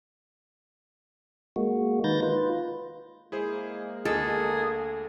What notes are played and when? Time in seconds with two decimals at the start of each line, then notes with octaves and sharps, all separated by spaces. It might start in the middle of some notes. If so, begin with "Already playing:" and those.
1.56 G#3 A#3 F#4
2.04 D#3 D#4 B4 G6 A6 A#6
2.23 F4 B4
3.32 G#3 A#3 E4 G#4 C5
4.05 D2 G#4 A4 D#5